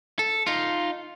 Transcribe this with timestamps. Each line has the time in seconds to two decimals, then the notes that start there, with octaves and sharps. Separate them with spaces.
0.19 A4
0.47 D#4 F4